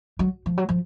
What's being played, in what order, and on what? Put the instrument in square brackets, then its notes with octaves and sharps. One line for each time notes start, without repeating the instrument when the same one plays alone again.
[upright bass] F#3
F3
F#3
F3